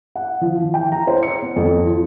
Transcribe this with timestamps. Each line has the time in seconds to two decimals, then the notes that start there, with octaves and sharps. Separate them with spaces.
0.15 F#5
0.41 F3
0.58 E3
0.74 G5
0.92 A#5
1.07 C5
1.23 C#7
1.42 B3
1.56 F2
1.85 F4